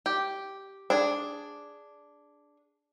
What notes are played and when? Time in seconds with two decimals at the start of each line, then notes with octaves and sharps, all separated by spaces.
0.06 G4
0.90 D4 G#4